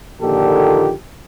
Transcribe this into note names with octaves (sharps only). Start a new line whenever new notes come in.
A#1 A#2 D3 D#3 G4 A4